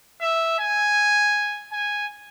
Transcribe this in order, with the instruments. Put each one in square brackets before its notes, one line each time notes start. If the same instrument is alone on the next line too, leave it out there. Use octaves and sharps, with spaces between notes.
[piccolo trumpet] E5
G#5
G#5